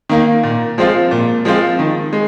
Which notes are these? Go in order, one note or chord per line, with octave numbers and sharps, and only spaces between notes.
D#3 A#3
A#2
F3 G#3 C4 F4
A#2
F3 G#3 C4 F4
D#3
G#3